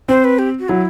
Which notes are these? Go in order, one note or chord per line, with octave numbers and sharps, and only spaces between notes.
C4 C5
B4
G4
F#4
F#3 E4